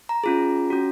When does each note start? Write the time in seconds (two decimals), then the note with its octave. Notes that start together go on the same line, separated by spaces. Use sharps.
0.09 A#5
0.24 C#4 F4 G#4
0.70 C#4 F#4